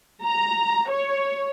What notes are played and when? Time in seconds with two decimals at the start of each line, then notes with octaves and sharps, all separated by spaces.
0.24 A#5
0.88 C#5